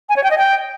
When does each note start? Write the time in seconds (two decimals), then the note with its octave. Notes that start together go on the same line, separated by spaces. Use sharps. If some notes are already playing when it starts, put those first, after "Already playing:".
0.09 G#5
0.16 C#5
0.23 G5
0.31 D#5
0.38 G5